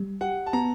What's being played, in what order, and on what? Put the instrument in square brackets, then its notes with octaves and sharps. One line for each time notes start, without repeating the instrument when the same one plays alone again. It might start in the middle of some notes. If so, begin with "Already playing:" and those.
Already playing: [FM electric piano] G3
[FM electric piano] G4 [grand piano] F#5
[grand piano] A5
[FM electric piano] B3 [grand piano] A#5